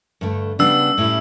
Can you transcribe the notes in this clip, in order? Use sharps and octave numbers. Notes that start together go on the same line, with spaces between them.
G2 D3 A3
C#3 G3 B3 D4 E6
A2 G3 C#4 E4